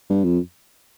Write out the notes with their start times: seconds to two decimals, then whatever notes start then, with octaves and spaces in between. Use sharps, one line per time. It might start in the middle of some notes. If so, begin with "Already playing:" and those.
0.10 G2
0.24 F2